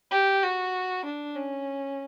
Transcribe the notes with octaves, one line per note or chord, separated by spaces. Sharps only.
G4
F#4
D4
C#4